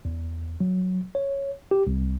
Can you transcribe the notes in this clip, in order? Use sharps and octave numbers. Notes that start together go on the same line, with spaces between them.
E2
F#3
C#5
G4
C2